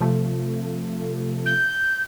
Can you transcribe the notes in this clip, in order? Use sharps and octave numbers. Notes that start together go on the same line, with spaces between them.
C3 F3 A3
G6